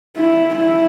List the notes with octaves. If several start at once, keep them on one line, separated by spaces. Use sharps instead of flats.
E4
E4